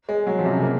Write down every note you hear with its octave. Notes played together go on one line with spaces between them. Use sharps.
G#3
F#3
F3
C3
C#3
A#3